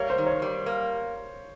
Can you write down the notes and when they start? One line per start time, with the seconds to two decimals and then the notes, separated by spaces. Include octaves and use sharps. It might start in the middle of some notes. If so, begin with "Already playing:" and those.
Already playing: G3 A#3 C#5
0.10 C5
0.18 D#3
0.27 C#5
0.42 G3
0.66 A#3